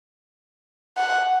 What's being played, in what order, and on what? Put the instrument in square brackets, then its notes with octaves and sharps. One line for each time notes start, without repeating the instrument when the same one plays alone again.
[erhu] F#5